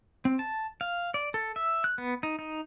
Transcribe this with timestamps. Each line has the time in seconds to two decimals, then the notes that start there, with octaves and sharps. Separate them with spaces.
0.25 C4
0.39 A5
0.81 F5
1.14 D5
1.34 A4
1.56 E5
1.84 F#6
1.98 B3
2.23 D#4
2.39 D#4